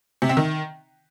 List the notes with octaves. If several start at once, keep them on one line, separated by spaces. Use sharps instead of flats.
C3
C4
D#3